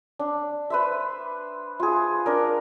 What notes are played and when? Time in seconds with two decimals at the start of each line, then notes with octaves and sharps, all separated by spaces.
0.19 D4
0.70 B4 C5 E5
1.80 F4 G#4
2.26 D4 A#4